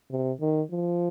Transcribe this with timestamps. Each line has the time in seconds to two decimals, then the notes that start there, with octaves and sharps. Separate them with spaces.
0.10 C3
0.41 D#3
0.71 F3